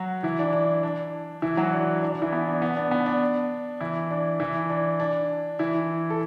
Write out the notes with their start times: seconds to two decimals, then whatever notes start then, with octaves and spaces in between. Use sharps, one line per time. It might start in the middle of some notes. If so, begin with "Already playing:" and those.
Already playing: F#3 F#4
0.23 E3 E4
0.39 D4
0.53 D4
0.83 D4
1.42 E3 E4
1.57 F#3 F#4
1.72 D4
2.02 D4
2.12 D4
2.22 E3 E4
2.32 B3
2.47 D4
2.62 B3
2.77 D4
2.91 B3
3.06 D4
3.80 E3 E4
4.11 D4
4.40 E3 E4
4.70 D4
5.00 D4
5.59 E3 E4
6.10 A4